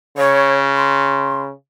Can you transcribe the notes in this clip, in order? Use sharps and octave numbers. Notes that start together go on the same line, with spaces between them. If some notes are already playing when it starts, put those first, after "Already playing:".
C#3 C#5
C6